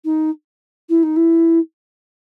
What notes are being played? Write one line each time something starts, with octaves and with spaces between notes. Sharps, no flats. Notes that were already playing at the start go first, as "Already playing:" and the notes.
D#4
E4
D#4
E4